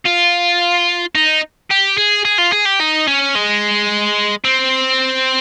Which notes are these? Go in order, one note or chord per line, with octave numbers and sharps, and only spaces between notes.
F4
D#4
G4
G#4
G#4
F4
G#4
G4
D#4
C#4
G#3
C4